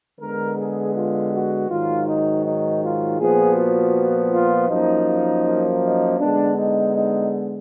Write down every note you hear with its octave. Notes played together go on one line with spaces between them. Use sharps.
D3 G#3 B3 A#4
G#4
F4
F#4
G#2 D#3 F#3 F4
D#4
D#4
F4
A#2 F3 B3 G#4
F#4
F4
F#2 F3 A#3 D#4
D#4
D3 G#3 B3 D4
D#4
D#4